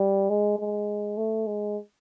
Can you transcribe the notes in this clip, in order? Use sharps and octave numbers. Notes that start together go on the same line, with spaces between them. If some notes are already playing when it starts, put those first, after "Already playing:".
Already playing: G3
G#3
G#3
A3
G#3